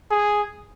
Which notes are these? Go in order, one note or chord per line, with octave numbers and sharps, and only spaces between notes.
G#4